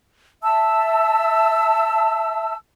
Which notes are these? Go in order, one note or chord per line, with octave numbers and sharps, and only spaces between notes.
E5 A5 E6